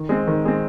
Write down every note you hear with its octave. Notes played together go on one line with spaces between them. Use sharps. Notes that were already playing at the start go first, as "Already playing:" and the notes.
Already playing: D#3
G#3 C4
D#3
G#3 C4